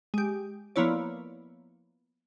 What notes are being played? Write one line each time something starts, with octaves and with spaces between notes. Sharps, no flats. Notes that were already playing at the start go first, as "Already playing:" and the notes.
G#3 G4
F3 A#3 B3 E4 C#5 D5